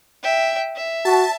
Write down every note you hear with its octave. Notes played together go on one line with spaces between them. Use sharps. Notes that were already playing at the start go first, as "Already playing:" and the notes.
E5 G5
E5
F#4 A5